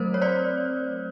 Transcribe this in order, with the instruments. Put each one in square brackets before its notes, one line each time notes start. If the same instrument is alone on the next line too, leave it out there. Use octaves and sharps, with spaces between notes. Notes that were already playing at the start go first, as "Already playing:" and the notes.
Already playing: [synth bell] F#3 A3 C4 A#4 C5
C#5
C5 D5